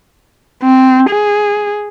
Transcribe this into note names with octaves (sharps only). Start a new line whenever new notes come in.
C4
G#4